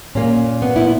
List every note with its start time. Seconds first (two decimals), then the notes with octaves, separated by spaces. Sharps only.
0.15 A#2 A#3 C#4
0.62 B3
0.76 E4